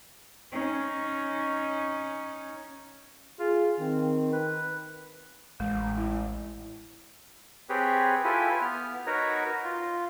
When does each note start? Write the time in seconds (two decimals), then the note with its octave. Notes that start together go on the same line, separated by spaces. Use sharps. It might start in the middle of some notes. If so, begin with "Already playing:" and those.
0.52 C#4 D#4
3.39 F4 G#4
3.80 D#3 C4
4.33 B4
5.60 A1 G#3
5.97 E4
7.69 C4 G4 G#4 B4 C#5
8.24 E4 F4 G4 A4 B4 G#5
8.62 B3 F6
9.07 D#4 F#4 A#4 B4 C#5 A#5
9.64 F4